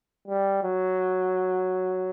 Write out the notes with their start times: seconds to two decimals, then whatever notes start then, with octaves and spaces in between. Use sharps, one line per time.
0.28 G3
0.63 F#3